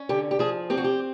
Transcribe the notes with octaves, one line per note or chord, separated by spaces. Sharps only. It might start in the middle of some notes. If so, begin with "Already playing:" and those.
Already playing: C#4
D3 G4
G4
F3 G#4
C4 G4
F#4
G4